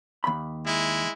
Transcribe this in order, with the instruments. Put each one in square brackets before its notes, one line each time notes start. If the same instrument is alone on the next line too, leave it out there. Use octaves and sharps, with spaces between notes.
[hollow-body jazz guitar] D#2 B5
[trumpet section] G#3 E4